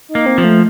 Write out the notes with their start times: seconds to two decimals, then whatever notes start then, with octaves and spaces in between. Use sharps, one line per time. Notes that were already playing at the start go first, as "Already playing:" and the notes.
0.09 D#4
0.15 A#3
0.26 C4
0.38 F3
0.44 A3